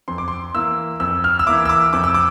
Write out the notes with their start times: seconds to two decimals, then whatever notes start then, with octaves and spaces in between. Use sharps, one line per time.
0.08 F2 C6
0.18 D6
0.28 C6
0.54 E3 A#3 E4 E6
1.00 F2 E6
1.24 F6
1.39 E6
1.46 E3 A#3 E4 D6
1.65 E6
1.69 D6
1.93 F2 D6
2.04 E6
2.14 D6